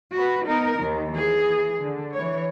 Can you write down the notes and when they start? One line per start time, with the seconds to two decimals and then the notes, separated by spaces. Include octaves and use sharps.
0.14 F#4 B4
0.46 B3 D#4 A#4
0.80 D#2 D#3
1.12 E3 G#4
1.80 D3
2.14 E3 C#5